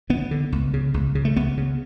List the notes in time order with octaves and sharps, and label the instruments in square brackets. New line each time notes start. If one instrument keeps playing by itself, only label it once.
[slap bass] D2 B3
D3
C#2
C#3
C#2
C#3
A3
C#2 B3
C#3